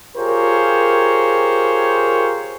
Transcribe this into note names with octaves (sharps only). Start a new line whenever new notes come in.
F4 G4 G#4 A#4 C5 C#5